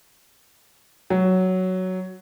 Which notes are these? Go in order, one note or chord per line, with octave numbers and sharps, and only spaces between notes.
F#3